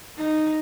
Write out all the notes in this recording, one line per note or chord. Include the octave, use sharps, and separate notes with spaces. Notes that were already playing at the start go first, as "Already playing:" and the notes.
D#4